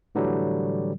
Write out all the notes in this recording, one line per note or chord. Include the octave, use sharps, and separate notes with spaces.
A2 D3 E3 F#3 G3